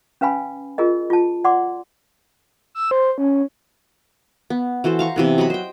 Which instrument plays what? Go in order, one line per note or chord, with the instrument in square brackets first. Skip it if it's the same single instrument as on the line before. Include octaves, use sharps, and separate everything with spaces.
[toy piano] C#4 B4 F5 G#5 B5
F4 G#4 A#4 D#5
F4 A5
D5 F#5 C6 D6
[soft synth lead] E6
C5
C#4
[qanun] B3
E3 F#4 A4 C5
F5 A#5 C#6
C3 E3 B3
F#3 D#5 F#5 B5
C5 G5